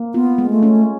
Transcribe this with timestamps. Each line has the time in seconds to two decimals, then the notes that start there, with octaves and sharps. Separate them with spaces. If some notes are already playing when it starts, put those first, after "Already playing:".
Already playing: A#3
0.14 B3 F4
0.38 G#3
0.50 A3
0.63 C#4